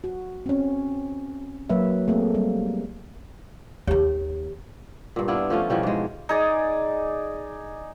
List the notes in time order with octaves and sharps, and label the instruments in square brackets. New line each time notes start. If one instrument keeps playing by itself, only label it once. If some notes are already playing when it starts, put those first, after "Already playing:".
[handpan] F#4
C4 C#4
F#3 A#3 B4 E5
A3 A#3 C4 G#4 A4
G3
[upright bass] D#2 D#3 [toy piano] G4 C#5
[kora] G2 A#2
B3 D4 E4 F4
F3 A3 C#4 F4
B2 E3 F3 G3
G#2 G#3
[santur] D#4 G#4 D5